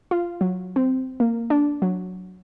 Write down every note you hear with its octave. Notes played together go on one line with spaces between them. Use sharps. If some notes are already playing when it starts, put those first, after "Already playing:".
F4
F#3
C4
A#3
D4
F#3